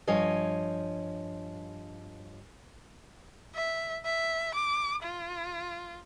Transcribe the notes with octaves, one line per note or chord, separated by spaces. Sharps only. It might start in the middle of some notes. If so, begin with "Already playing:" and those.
G2 F3 C#5 D#5 G#5
E5
E5
D6
F4